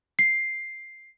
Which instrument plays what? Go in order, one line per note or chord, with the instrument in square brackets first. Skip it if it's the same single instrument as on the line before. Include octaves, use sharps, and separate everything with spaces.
[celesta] C7